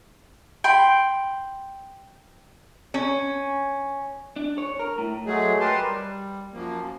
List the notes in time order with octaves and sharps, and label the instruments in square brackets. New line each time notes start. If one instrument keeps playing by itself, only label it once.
[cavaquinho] G5 B5 C6
[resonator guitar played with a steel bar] C#4
[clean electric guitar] D4
C#5
A#4
A2
[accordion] F#3 G#3 A3 G#4
G4 A#4 B4 A5 C6
G3
F#2 F3 A#3